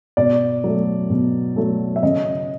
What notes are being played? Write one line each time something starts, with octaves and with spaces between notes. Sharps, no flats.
B2 D5
F#3 A3
B2
F#3 A3
E5
C#3 D#5